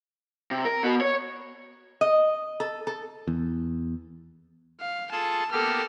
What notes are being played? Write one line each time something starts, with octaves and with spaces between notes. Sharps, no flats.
C3
A#4
B3 F#4
C#5
D#5
A4
A4
E2
F5
F4 G#4 A4 A5
A#3 B3 G4 A4 F6